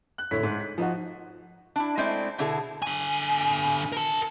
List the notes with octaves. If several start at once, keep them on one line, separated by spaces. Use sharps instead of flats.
F#6
F1 A2 D3 E4 C#5 B6
G#2
B6
F3 D#4 F#4
D4 E4
G#3 A3 C4 E4 D5
B2 D3 B3 E4 G#4 A4
D3 G#5
A#4 A5